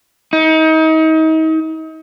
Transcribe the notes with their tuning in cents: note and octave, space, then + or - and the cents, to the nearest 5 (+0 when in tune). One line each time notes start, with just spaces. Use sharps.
D#4 +35